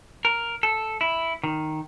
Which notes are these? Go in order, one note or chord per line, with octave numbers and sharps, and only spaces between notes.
A#4
A4
E4
D#3